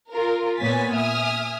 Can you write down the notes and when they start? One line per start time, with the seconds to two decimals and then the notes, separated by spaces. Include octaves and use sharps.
0.13 F4 A#4
0.58 A#2 B3 C#5 G#5 A6 B6
0.93 E5 G#5 D#6 F6